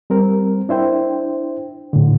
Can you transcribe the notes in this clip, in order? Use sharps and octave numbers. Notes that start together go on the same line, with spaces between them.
G3 C4 A#4
D4 E4 C5 G5
A2 D3